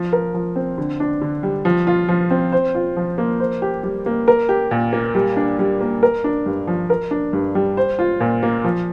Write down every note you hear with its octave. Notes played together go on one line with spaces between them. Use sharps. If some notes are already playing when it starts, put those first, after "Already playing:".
Already playing: F3
A#4
F3
C4
D3
D4
D3
G3
F3
F4
F3
C4
C5
F4
F3
A#3
C5
G4
G3
A#3
A#4
G4
A#2
A#3
G3
D4
G3
A#3
A#4
D4
G2
F3
A#4
D4
G2
G3
C5
F4
A#2
A#3
F3